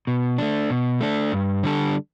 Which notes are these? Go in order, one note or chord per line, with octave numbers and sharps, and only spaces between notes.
B2
A3 D4
B2
A3 D4
G2
D3 G3 D4 A4